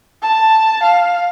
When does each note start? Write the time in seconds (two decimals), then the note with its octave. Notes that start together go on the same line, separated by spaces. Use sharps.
0.22 A5
0.83 F5